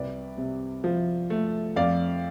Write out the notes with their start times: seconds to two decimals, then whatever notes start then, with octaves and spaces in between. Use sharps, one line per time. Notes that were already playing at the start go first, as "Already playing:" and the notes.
Already playing: C2 B4 D5
0.38 C3
0.84 F3
1.30 A3
1.76 F2 D5 F5